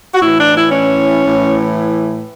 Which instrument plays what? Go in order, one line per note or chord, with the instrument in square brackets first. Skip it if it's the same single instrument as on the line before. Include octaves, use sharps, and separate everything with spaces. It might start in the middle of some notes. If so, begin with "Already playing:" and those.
[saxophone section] F#4
A2 E3 E4
D4
E4
C#4
A2 E3